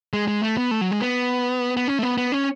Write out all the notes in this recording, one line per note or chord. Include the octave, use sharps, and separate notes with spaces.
G#3
G#3
A3
B3
A3
F#3
G#3
B3
B3
C#4
A3
B3
B3
C#4